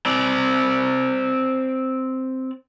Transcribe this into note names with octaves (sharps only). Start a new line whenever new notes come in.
C4 D5